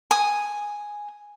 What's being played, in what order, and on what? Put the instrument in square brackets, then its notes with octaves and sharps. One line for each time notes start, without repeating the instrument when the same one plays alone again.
[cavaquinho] G#5 D#6